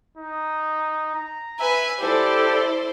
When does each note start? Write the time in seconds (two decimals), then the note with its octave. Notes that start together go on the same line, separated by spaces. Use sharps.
0.17 D#4
1.15 A#5
1.60 B4 E5 G#5
2.00 E4 G4 A4 C5 D5